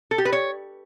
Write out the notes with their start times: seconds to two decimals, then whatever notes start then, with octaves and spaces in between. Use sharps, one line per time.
0.11 A4
0.18 G4
0.25 B4
0.33 C#5